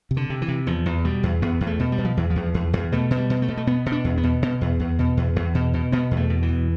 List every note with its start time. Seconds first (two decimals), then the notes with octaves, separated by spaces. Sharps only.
0.11 C3
0.17 D3
0.30 C3
0.42 E3
0.48 C3
0.67 E2 F3
0.86 E2
1.04 B2 G3
1.23 E2
1.42 E2 B3
1.61 E2
1.67 A3
1.79 B2
1.92 G3
1.98 B2
2.05 F3
2.17 E2 E3
2.30 F3
2.36 E2
2.54 E2
2.73 E2
2.92 B2 A3
3.11 B2
3.17 G3
3.30 B2
3.42 A3
3.48 B2
3.57 A3
3.67 B2 B3
3.86 B2
3.92 D4
4.04 E2
4.18 B3
4.23 B2
4.42 B2
4.61 E2
4.80 E2
4.99 B2
5.17 E2
5.36 E2
5.55 B2
5.74 B2
5.92 B2 B3
6.11 E2
6.17 A3
6.30 B2
6.42 E3
6.49 E2